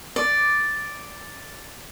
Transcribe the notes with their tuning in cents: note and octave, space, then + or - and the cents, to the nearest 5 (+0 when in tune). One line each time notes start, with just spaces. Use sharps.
D5 +0